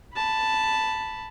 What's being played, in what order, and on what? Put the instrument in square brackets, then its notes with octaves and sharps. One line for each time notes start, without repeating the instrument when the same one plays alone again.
[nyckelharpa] A5 B5